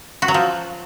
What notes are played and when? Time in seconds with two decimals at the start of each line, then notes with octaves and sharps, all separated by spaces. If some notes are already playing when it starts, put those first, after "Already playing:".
0.22 F#4
0.28 F#3
0.34 F3